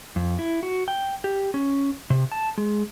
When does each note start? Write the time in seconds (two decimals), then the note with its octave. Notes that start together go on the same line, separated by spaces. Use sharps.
0.16 F2
0.39 E4
0.63 F#4
0.88 G5
1.24 G4
1.54 C#4
2.10 C3
2.32 A5
2.58 G#3